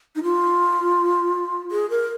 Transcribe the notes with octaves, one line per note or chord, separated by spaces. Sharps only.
D#4
F4
G#4
A#4